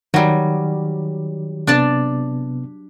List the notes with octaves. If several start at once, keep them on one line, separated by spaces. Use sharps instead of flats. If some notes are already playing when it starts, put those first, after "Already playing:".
D#3 F#3 G3
C3 B3 D4 D5 A5